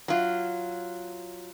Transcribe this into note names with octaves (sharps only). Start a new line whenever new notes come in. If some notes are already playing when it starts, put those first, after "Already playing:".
F#3 F4